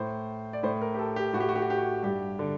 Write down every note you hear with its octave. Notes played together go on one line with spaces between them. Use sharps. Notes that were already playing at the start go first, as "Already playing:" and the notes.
Already playing: A2 C5
D5
A2 C5
A#4
G4
A4
G4
A2 F#4
G4
F#4
G4
F#4
G4
F#4
G2 G4
D3